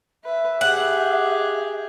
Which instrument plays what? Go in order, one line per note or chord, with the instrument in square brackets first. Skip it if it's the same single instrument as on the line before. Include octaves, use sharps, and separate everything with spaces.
[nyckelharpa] B4 [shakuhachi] E5
[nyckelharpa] G4 G#4 [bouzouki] F#5